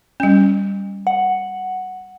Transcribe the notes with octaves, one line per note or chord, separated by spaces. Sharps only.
G3 C#4
F#5